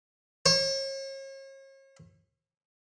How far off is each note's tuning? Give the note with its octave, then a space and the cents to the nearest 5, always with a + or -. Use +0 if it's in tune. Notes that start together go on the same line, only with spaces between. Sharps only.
C#5 -40